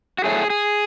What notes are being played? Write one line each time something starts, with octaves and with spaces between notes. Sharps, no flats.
F#4
A2 F#3 A3 G#4
G#4